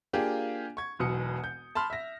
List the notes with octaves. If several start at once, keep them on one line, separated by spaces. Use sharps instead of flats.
A#3 D4 F4 G4 G#4
C#6 G#6
E1 B1 B2 D#6 C#7
G6
A5 B5 C6 F6
E5 A#6